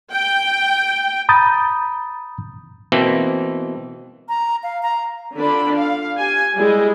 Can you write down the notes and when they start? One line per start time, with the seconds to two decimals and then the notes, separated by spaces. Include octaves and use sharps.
0.11 G5
1.29 A#5 B5 D#6 G6 A6
2.92 B2 E3 A#3 C4
4.29 A#5
4.63 F5
4.83 A#5
5.35 D3 D4 F4 B5
5.75 F5
6.14 G4 G#5
6.56 G3 G#3 E4 G#4